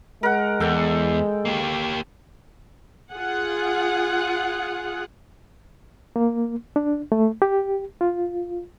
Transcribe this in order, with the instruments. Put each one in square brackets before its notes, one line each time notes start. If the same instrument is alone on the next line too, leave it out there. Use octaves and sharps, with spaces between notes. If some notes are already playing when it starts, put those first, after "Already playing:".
[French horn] G#3 [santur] A#4 F#5
[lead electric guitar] E2 [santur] A4 G5
[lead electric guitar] A#3 G4
[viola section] F4 G#4 F#5
[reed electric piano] A#3
D4
A3
G4
F4